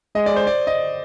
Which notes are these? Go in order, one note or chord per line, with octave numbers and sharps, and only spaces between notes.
G#3 D#5
D5
C5
D5
D#5